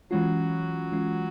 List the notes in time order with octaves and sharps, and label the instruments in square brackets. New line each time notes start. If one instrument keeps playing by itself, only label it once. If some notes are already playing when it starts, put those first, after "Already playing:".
[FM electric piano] E3 G#3 C#4 F4 [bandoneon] F#3 F#4
[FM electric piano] E3 G#3 C#4 F4